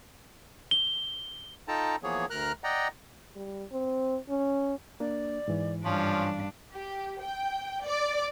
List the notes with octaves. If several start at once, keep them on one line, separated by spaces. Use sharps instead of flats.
G7
D#4 F4 A4 G5 A5 A#5
E3 F3 A#3 B3 G#4 C#5
D2 A#4 A#5 F6 F#6
D5 D#5 F#5 G5 A#5
G3
C4
C#4
A#3 D4 D5
G#2 E3
G2 F3 C#4 D4 F5
G4
G5
D5